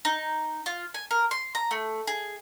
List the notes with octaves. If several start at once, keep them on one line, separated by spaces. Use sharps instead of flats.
D#4
F4
G#5
A#4
C6
A#5
A3
G#4